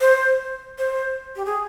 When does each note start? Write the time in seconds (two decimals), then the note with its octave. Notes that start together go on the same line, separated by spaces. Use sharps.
0.01 C5
0.78 C5
1.36 G4
1.45 G#4